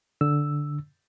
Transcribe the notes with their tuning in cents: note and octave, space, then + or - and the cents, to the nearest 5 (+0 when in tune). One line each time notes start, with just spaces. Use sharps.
D3 +0 E6 +0